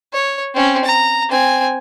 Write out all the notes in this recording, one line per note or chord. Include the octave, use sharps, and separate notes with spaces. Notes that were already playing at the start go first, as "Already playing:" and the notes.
C#5
C4 C#4
A#5
C4 G#5